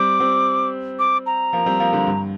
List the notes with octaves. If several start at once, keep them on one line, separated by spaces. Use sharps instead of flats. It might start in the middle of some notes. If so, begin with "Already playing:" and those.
Already playing: G3 C4 D6
G3 C4
D6
A#5
F3 A#3
G3 C4
F3 A#3
D3 G3
G2